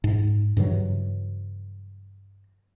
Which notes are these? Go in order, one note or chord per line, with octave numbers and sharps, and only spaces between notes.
G#2
G2 C#3 E3 F#3